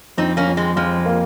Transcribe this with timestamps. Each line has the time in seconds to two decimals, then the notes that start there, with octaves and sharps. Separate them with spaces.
0.18 F2 C4 D#4
0.37 A#3 C#4
0.47 F2
0.57 G#3 C4
0.76 F2 F3 G#3
1.06 A#3